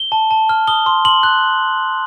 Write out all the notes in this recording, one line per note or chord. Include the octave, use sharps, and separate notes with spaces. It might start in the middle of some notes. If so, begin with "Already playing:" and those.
Already playing: G7
A5
A5
F6
D#6 G7
C6
C6 F#7
F#6